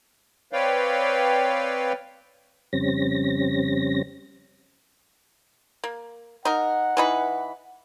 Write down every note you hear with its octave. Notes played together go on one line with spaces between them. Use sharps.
C4 B4 C#5 D5 F5 G5
F2 C#3 G3 C4 C#4 A#6
A#3
D#4 A#4 F#5
E3 D#4 B4